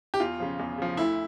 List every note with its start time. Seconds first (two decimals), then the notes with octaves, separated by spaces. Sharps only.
0.14 G4
0.20 E2 F4
0.40 C#3 F3
0.59 E2
0.78 C#3 F3
0.97 D2 E4